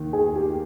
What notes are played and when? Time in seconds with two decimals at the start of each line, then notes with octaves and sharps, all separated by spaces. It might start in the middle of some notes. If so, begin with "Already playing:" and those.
Already playing: D#2 D#3
0.13 G#4
0.35 A#3 G4